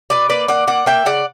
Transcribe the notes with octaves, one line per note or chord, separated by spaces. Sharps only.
B2 B4 D5
A#3 B4 D5
A#3 D5 F#5
A#3 D5 F#5
A#3 E5 G5
C#3 D5 F#5